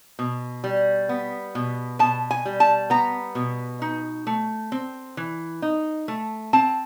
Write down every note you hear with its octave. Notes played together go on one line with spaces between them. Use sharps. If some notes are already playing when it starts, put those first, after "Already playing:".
B2
G3
B3
B2
B2 A5
G#5
G3
A5
B3 A#5
B2
D#4
A3
C4
E3
D#4
A3
C4 A5